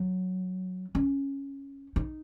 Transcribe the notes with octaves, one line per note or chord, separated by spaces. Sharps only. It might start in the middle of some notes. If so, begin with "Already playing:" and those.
Already playing: F#3
C#4
D#4